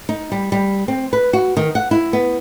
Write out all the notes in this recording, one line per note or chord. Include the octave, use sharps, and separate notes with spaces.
D#4
G3
G3
C4
B4
F#4
D#3
F#5
E4
B3